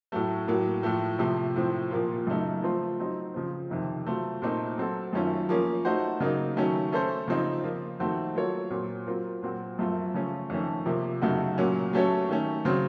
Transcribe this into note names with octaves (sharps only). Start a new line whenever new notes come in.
A2 F#3 A3
A2 F#3 A#3
A2 F3 A3
C3 F3 A3
A2 F3 C4
A#2 F3 A#3 F4
F#2 C#3 A3 D#4
F3 A3 C4 F4 C5
F#3 C4 D#4
C#3 F3 C4
F2 C3 D#3
F#3 A3 C4 F4
A#2 A3 C4 D#4
F#3 C4 F#4 A4
F#2 D#3 A3 C#4 F4
F3 A#3 C#4
A3 D#4 F#4 C5
C#3 F#3 A#3 D#4
D#3 F#3 A3 C#4
A3 C#4 A4 C5
C#3 F3 C4 D#4
F3 A#3 F4
F2 D#3 A3 C4 F#4
F#3 A#3 F4 A4 C#5
A#2 F#3 C4
F#3 C4 F4 A#4
A#2 F#3 C4 F#4
F#2 F3 A3 C4 F4
C#3 F3 A3 C#4 F4
F2 D#3 A3 C#4
C3 F3 A#3
F#2 C#3 A3 D#4 F#4
A#2 F#3 A#3 C#4
F#3 A3 C#4 A4 C#5
D#3 A3 C#4
C#3 F#3 C4